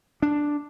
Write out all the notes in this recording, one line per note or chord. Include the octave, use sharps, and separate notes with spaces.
D4